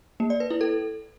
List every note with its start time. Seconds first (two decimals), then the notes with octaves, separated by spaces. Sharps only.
0.20 A#3
0.30 D5
0.40 B4
0.51 E4
0.61 A4